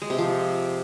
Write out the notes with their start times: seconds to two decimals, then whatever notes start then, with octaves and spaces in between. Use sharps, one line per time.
0.02 G#3
0.10 C3
0.18 F3